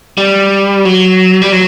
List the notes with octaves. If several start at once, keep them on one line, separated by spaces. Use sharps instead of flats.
G3
F#3
G3
F#3